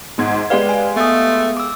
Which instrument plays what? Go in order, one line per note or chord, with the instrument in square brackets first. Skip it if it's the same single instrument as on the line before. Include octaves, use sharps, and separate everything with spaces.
[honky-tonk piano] G#1 G#2 G#6
[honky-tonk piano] G#3 G4 F5 [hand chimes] B4 D5
[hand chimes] G#5
[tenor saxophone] A3 [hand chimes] B3 D#6
[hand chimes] D6 E6